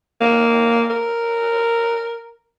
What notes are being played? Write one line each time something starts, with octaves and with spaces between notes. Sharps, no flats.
A#3
A#4